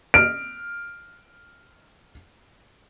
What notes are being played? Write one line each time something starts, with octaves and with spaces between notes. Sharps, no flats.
F6 D7